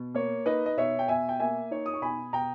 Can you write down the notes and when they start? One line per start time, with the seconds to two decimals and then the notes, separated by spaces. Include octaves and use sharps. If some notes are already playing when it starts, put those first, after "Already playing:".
Already playing: B2
0.14 A#3 C#5
0.46 D#4 B4 D#5
0.66 D#5
0.77 B2 C#5 E5
0.99 G5
1.08 B2 E5 G#5
1.29 G5
1.40 A#3 E5 G#5
1.71 D#4 C#5
1.86 D#6
1.94 C#6
2.02 B2 G#5 B5
2.33 B2 G5 A#5